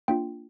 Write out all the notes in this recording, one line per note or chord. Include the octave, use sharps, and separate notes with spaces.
A#3 D4 F4 G5